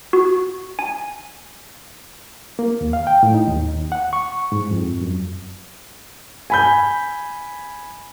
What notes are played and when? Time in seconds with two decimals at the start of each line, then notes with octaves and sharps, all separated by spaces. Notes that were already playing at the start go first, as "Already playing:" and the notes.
0.13 F#4
0.79 G#5
2.59 A#3
2.81 D#2
2.93 F5
3.07 G5
3.23 A2
3.34 D#4
3.47 D#2
3.92 F#5
4.13 C#6
4.52 G#2
4.71 F2
5.01 F#2
6.50 G#5 B5 G6